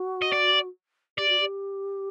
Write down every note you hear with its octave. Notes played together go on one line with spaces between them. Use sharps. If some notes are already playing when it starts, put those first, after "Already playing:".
Already playing: F#4
D#5
D5
G4 D5
F#4
G4